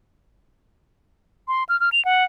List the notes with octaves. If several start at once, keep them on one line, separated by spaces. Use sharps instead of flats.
C6
F6
F6
F7
F#5